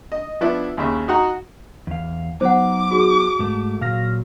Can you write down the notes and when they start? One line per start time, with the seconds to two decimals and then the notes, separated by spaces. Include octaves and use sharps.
0.12 D#5
0.41 F3 B3 D4 E4
0.77 D#2 C#3 E5
1.08 D#4 F#4 F#5 A#5
1.87 E2 F5
2.41 F#3 B3 D#4 C5 F#5 D6
2.91 F#4 G#4
3.39 G#2 A3
3.81 A#2 F#3 F5 F6 A#6